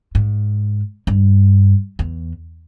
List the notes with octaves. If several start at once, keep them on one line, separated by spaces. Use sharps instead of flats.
G#2
G2
E2